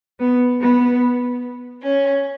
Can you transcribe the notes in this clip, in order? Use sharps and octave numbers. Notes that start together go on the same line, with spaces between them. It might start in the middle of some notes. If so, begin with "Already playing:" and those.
B3
B3
C#4